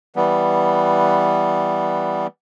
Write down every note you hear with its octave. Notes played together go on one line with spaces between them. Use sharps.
E3 G3 B3